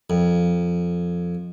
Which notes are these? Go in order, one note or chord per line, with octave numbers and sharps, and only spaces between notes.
F2